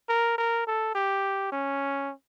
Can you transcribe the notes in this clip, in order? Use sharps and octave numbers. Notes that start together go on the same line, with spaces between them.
A#4
A#4
A4
G4
C#4